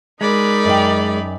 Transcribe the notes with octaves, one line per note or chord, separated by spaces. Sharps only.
G#3 D#4 A#4 D5 B5
F#2 D#5 G5